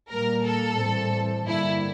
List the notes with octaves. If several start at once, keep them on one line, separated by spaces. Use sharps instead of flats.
A#2 G3 A#3 A#4
A4
A2 E3 G3 C4
G2 D3 G3 A#3 E4